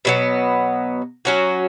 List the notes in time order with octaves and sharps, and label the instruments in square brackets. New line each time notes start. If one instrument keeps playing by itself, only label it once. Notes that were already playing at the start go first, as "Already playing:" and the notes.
[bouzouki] B2 F#3 B3
F#3 C#4 F#4